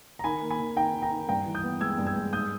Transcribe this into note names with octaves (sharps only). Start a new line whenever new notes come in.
A#5
D#3 G#5 B5
A#3
G#5 B5
D#3
D#3 G5 A#5
D#3
G5 A#5
D#3
G2 G5 A#5
E3
D#6 G6
B3
G#3 E6 G#6
G2
E6 G#6
G#3
G#2 D#6 G6